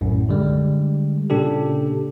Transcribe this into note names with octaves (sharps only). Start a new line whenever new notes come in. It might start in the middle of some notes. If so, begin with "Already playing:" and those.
B1 F#2 A2
D3 G3 G#3
A#2 C#3 D4 G4 A4